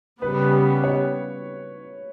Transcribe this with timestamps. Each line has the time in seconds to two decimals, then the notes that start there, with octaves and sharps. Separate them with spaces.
0.22 C#3 G3 B3 B4
0.53 B4
0.84 C#5